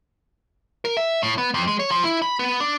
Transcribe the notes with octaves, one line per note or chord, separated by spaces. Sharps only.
A#4
E5
A2
B3
F2
G#3
C#5
F3
E4
B5
B3
D4